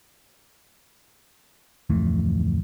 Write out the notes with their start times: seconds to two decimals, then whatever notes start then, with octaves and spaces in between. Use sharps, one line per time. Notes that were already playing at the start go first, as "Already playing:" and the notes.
1.90 D1 F2 E3 A3